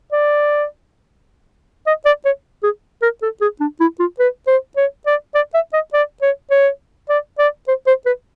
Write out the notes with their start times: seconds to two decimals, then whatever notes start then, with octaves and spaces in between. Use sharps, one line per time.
0.12 D5
1.87 D#5
2.06 D5
2.25 C#5
2.63 G#4
3.02 A#4
3.23 A4
3.41 G#4
3.61 D4
3.80 E4
4.00 F4
4.19 B4
4.47 C5
4.77 C#5
5.07 D5
5.35 D5
5.54 E5
5.73 D#5
5.93 D5
6.22 C#5
6.51 C#5
7.09 D5
7.39 D5
7.68 C5
7.87 C5
8.06 B4